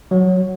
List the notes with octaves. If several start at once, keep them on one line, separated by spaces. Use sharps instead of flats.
F#3